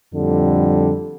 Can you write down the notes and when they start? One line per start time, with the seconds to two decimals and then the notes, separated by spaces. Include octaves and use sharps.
0.14 F2 A2 D3 G3